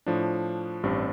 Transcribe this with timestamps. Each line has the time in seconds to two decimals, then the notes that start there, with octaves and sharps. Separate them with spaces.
0.06 A2 F3 D4
0.83 A1 G2 G3 C4